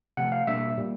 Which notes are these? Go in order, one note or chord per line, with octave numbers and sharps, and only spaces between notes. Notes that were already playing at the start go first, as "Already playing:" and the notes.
C3 F3 A3 F#5
F5
B2 G3 A#3 D4 E5
A#2 G3 A#3